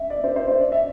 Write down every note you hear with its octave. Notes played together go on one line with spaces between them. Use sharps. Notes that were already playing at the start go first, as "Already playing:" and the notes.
Already playing: E5
D5
C5
C5
C5
D5
E5